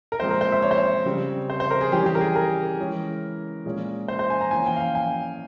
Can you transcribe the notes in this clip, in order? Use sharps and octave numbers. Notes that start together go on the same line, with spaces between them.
A#4
A#2 F3 G#3 C4 C5
A#4
C5
E5
C#5
C5
C#5
C#3 G3 C4
C5
C5
A#4
G#4
E3 G3 C#4 G4
G4
A#4
G#4
A#4
E3 G#3 C#4
A#2 G#3 C#4
C5
C5
G#5
A#5
E3 A#3 C#4 G#5
G5
F5
G5
G#5